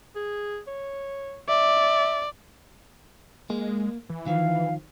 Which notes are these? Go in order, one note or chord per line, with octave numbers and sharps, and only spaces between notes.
G#4
C#5
D5 E5
G#3 A#3
E3
D#3 F3 F5